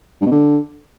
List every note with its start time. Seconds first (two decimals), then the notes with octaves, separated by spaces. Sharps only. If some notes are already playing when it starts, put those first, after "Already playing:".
0.21 G2
0.26 B2
0.32 D3